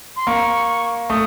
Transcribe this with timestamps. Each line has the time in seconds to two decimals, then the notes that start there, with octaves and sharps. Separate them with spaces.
0.16 C6
0.27 A#3 C#6
1.10 A3 D#6